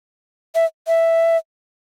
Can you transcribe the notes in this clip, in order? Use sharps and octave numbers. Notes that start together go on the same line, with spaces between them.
E5
E5